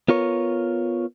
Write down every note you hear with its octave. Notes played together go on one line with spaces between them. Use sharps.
B3 F4 A#4 C#5